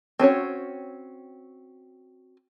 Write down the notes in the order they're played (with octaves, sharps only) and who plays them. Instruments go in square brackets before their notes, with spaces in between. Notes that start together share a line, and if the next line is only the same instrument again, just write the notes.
[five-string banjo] C4 C#4 F#4 C#5